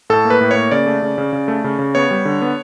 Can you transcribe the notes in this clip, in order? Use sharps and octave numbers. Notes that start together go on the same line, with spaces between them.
A2 A4
A#3
B4
A2
A#3 C#5
C#3 D5
A3
C#3
C#3
C#3
A3
C#3
C#3
B3 C#5
G3
D3
B3